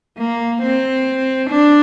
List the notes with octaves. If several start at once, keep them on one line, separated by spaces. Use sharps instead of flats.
A#3
C4
D4